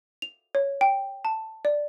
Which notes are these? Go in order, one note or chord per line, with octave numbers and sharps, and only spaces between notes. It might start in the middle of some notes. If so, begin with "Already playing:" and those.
F7
C#5
G5
A5
D5